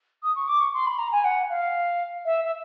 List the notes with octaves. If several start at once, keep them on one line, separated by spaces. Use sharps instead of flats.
D#6
C#6
D6
C#6
C6
B5
A#5
G#5
F#5
F5
E5
E5